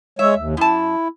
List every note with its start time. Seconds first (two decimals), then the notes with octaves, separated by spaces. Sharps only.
0.19 G#3 C#5 E5
0.37 D#2
0.57 F#2 E4 A5